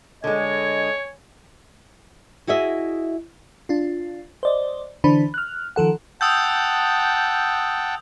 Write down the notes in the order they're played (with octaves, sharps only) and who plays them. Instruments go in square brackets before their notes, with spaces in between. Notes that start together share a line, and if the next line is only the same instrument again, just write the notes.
[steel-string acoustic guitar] D3 G#3 [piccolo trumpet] C#5 [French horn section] D#5 [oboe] G#5
[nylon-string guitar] E4 F#4 G#4 D#5 E5
[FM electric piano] D4 F4
C5 D5 D#5
D3 E3 D4 C5 B5
F6 F#6
D#3 F3 A4 F#5
[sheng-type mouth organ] F#5 G5 A5 [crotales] D#6 E6 G6